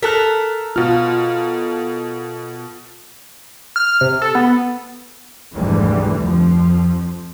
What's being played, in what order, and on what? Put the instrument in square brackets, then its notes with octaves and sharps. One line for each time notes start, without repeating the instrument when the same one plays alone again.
[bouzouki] A4 A#4 [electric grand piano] F#6 B6
[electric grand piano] B2 F6 [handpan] F4
[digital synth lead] F6
C3
A4
B3
[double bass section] F1 D2 G#2 D3 E3 G3
F2 F3